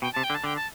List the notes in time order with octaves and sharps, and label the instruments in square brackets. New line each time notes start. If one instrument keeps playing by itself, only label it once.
[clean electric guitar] B2 [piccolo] G5
[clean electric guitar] C3 [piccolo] A5
[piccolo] G5
[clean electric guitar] D3
[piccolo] A5
[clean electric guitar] D3 [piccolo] G5
[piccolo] A5